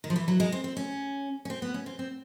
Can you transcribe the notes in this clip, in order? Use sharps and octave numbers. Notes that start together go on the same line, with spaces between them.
D#3
F3
E3
F#3
G#3
C4
C4
C#4
C#4
C4
B3
C#4
C4
C4